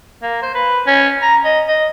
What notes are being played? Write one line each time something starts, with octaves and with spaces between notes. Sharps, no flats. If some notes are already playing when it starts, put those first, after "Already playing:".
A#3
C5
B4
C#4
A#5
D#5
D#5